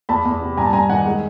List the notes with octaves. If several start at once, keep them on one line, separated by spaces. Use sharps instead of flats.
E2 A5 B5
E2
C3
G2 G#5 A#5
A5
G2 G#5 A#5
D#3 F#5 G#5
G#3